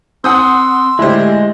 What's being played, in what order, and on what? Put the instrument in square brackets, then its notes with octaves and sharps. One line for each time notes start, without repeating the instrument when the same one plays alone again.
[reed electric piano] C4 [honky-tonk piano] F#5 D#6 G6 [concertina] C6 E6
[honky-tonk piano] A2 D3 C5 [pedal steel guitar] G#3 [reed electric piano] E4 G4